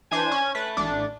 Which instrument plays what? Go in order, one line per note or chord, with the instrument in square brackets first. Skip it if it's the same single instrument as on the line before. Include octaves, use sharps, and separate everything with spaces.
[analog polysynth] E3 D4 C5 [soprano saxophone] G#5
[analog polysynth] C#4
[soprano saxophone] A3 [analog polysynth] B4
[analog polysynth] A1 D4